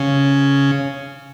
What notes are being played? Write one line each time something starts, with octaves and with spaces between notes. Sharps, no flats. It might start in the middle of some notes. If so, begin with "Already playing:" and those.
Already playing: C#3